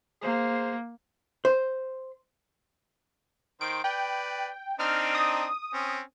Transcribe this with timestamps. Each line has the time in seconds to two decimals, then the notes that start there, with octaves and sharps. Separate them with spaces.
0.22 A#3 G#4 C5
1.45 C5
3.61 D#3 C5 D7
3.84 B4 D5 G5
4.80 C4 D4 D#4 F6
5.15 D#6
5.74 C4 C#4